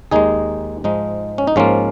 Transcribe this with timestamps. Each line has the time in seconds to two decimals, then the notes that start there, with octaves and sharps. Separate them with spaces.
0.11 D#2 D#3 G#3 D#4 G#4
0.84 G#2 F3 G#3 D#4
1.38 C#4
1.47 D#4
1.56 G#2 F3 A#3 C#4 F4